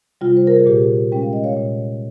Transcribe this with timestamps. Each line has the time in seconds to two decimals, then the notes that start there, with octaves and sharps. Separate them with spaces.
0.21 C3 G3 F4
0.37 C5
0.47 A#4
0.56 G#4
0.66 A#2 G4
1.12 G#3 C#4 G5
1.22 F5
1.33 D#5
1.44 C#5 F5
1.57 A#2